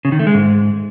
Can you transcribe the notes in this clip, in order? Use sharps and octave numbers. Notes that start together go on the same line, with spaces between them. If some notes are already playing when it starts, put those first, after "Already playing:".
C#3
D#3
A3
G#3
G#2